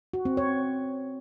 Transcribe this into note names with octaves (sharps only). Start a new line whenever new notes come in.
F#4
C4
C#5